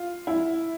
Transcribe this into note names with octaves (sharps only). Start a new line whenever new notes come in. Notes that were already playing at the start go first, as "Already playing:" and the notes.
Already playing: F4
E4